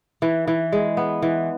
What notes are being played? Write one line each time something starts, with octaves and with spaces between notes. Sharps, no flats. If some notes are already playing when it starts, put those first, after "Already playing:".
E3
E3
G#3
B3
E3